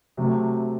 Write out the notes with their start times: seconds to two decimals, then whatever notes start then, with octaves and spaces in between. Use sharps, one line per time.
0.17 C3 F#3 A3